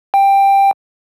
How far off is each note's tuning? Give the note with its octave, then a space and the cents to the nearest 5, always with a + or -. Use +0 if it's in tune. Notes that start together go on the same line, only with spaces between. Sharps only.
G5 +10